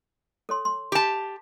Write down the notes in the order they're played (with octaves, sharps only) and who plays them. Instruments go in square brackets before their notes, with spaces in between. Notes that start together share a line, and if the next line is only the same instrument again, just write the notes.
[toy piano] A4 C#5 C6
C6
[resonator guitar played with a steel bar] G4 A5